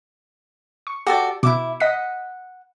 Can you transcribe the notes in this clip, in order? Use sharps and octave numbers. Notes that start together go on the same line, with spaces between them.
C#6
F#4 G4 A4 D5
B2 E4 E5 D6
D#5 F#5 B6